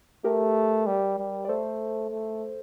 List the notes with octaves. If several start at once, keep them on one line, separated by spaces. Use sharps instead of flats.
A3 G4 A#4
G3
G3
D5
A3 A4 C5
A3